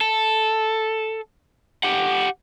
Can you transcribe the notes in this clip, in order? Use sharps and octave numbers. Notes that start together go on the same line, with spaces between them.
A4
G4 F#5